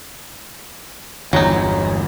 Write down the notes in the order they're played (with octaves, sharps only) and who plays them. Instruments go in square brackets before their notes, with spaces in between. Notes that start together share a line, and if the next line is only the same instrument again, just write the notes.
[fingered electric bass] G1 E2 [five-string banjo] F#3 D#4